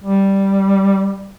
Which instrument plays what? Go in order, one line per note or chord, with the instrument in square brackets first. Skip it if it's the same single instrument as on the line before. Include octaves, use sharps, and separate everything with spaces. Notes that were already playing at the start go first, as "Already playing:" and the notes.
[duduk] G3